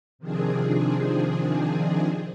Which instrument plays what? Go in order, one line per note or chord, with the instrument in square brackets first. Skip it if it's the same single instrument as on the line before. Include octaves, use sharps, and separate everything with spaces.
[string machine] C3 D#3 F3 C4 D4 G#4